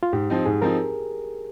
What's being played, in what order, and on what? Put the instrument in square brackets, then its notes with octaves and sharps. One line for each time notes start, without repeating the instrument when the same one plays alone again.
[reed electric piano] F4
[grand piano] G#2 [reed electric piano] G4
[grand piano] F3 C4 D#4
[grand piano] G#2 [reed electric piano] G#4
[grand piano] F3 C4 D#4 [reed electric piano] A#4